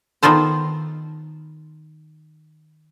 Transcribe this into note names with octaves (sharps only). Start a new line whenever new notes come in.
D#3 B3 F4 A4 C5